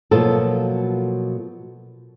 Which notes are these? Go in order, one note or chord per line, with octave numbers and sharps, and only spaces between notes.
B2 F3 F#3 A#3 B3 A4